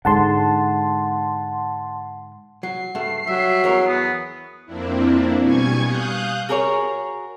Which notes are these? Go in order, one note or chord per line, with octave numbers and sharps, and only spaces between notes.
G#2 D3 F#5 A5 C6
F#3 C7
G2 A3 E5
F#3 G3 E5
E2 A#4 C#5
B3 D#6
F2 A#3 C4 D4 E4
B2 G3 G#5 C#6 G#6
F5 D#6 F#6 G6
F#4 G#4 A#4 B4 C#5